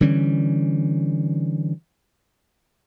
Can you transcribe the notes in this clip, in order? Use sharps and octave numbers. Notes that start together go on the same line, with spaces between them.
D3 E3 G3 C#4